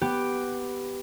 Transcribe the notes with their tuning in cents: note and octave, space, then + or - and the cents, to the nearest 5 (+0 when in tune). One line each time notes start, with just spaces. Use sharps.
B3 +0 G4 +0